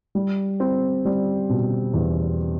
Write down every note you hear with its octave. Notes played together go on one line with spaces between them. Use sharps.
G3
C4
G3
B2
E2